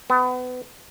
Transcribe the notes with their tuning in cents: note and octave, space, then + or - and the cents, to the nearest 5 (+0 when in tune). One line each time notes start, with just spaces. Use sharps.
B3 +30